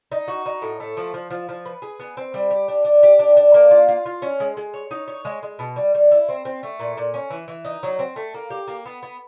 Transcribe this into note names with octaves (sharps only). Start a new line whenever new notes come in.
D#4
F#4
D#4
A2
A3
F3
F3
F3
F3
B4
G#4
B3
C4
G3
G4
D4
D4
G4
D4
D4
A#3
F4
F4
F4
C#4
G#3
G#3
C#5
D#4
C#5
G#3
G#3
B2
G3
G3
E4
C4
C4
A3
A#2
A#2
C#4
E3
E3
D#4
F#3
C4
A3
A#3
G4
A#3
B3
B3